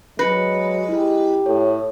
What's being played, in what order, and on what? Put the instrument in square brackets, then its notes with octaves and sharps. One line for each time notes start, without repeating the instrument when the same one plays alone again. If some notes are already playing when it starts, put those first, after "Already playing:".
[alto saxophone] F#3 [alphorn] G#3 [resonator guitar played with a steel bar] B4 [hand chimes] A#6 C#7
[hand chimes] E4 [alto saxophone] G4
[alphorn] A2 [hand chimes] A4 C#5